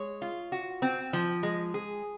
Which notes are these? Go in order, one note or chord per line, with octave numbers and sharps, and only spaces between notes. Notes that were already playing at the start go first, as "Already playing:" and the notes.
Already playing: G#3 C#5
F4
F#4
C4
F3
G#3
G#4